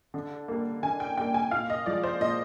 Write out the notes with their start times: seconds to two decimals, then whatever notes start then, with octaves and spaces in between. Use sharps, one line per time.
0.14 D3
0.48 G3 A#3
0.83 D3 G#5
1.00 G5
1.17 G3 A#3 G5
1.34 G#5
1.51 A#2 F5
1.70 D#5
1.86 F3 G#3 D5
2.04 C5
2.21 A#2 D#5